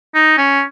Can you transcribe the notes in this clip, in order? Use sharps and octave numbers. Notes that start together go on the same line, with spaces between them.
D#4
C#4